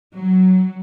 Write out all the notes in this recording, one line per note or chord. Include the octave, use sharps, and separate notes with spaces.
F#3